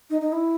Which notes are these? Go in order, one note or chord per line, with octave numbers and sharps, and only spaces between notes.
D#4
D#4
E4